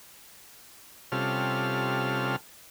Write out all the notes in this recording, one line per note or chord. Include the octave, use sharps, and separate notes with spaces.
C3 G3 C#4 F4 A4 F6